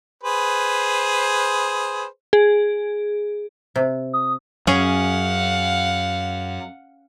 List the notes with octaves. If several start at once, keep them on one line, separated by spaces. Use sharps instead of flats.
G#4 B4 C5
G#4
C3
D#6
F#2 C#4 G#4 F5 F#5